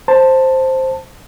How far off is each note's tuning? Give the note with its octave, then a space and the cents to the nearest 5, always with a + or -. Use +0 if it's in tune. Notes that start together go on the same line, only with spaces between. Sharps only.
C5 +5 A5 +10